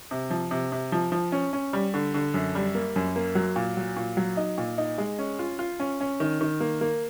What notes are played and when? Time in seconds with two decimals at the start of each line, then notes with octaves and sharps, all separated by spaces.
0.11 C3
0.30 F3
0.51 C3
0.72 C3
0.92 F3
1.12 F3
1.32 C#4
1.53 C#4
1.73 G3
1.94 D3
2.14 D3
2.34 F#2
2.55 G3
2.75 A#3
2.96 F#2
3.16 A#3
3.35 F#3
3.56 A#2
3.77 F#3
3.97 A#2
4.17 F#3
4.37 D#4
4.58 A#2
4.78 D#4
4.98 G#3
5.19 C#4
5.39 F4
5.59 F4
5.80 C#4
6.01 C#4
6.20 D#3
6.41 D#3
6.60 A#3
6.81 A#3